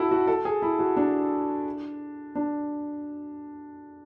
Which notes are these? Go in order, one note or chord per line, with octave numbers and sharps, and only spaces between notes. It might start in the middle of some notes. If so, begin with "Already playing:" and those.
Already playing: E4 F#4 A4
F#4
A4
G#4
E4
F#4
D4
D4